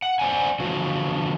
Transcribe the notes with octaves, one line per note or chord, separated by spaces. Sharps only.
F#5
C5 D5 F#5 G#5
D3 E3 F3 F#4